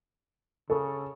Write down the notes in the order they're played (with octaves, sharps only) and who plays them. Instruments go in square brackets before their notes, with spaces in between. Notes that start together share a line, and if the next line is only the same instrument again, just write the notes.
[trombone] C#3 [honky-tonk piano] A4